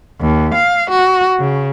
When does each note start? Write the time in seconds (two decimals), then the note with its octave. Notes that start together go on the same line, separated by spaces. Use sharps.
0.21 D#2
0.54 F5
0.90 F#4
1.40 C#3